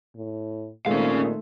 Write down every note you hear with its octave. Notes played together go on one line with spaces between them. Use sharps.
A2
A#2 D#3 G#3 A3 C4 C#4 F5